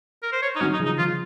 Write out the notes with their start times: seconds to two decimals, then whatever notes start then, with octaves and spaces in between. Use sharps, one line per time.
0.23 A#4
0.33 C5
0.42 C#5
0.56 D#4
0.61 D#3 F#3 C#4
0.73 D#4
0.80 C#3 F3
0.86 D#4
0.98 C#3 F3 F4